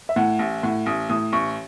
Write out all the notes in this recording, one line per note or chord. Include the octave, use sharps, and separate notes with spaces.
E5
A2 F#5
A1
A2 F#5
A1 D#6
A2 D#6
A1 C#6